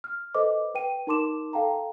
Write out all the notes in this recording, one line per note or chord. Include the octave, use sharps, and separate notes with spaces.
F6
A4 B4 C5 D#5 D6
B4 G5 D#7
D#4 A#4 A5 C6 D6 E7
A4 F5 G5 A5 A#5